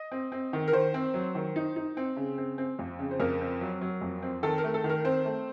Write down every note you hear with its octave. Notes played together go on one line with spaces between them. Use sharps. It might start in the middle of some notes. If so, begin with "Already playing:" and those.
Already playing: D#5
C4
C4
D#3
A#4
D#3 C5
C4
F#3
D#3
D#4
D#4
C4
C#3
C4
C4
F2
C#3
C5
F2 A#4
C4
F#3
F#3
F2
C4
D#3 A4
A#4
A3
A4
D#3
A#4
C4 C5
A3